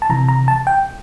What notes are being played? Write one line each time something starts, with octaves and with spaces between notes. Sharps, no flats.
A5
C3 E3 A#5
A#5
A5
G5